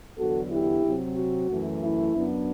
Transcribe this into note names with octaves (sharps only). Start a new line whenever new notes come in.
E2 D3 F#3 B3 D4 F#4 A4
E4 G4
C3 F#3 C4
F#4
F#2 E3 A3
E4
F#2 F#3 B3 D4